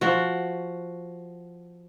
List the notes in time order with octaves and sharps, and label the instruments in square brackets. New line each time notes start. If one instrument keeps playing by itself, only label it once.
[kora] F3 F#4